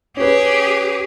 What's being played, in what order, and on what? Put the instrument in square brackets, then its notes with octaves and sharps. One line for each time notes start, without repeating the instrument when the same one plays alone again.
[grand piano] C#4 B4 [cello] G4 G#4